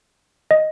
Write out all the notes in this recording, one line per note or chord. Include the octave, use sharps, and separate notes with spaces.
D#5